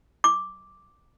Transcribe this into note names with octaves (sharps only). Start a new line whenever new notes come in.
D6